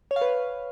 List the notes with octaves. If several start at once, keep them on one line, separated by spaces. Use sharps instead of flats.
C#5
F5
B4